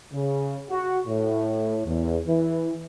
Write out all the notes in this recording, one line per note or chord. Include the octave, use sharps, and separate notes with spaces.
C#3
F#4
A2
E2
E3